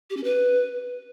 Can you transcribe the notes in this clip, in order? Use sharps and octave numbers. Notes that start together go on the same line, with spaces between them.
G4
C#4
B4